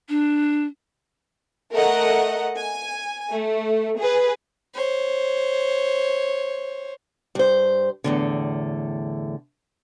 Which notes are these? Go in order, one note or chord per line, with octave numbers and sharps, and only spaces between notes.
D4
A3 A#4 D#5 F#5
G#5
A3
G#4 B4
C5 C#5
G2 C5
E2 A2 D3